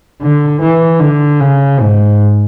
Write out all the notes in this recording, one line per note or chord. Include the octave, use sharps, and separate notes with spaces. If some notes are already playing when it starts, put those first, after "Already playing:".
D3
E3
D3
C#3
G#2